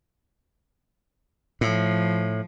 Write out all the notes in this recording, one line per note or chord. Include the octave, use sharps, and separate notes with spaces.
A2 F3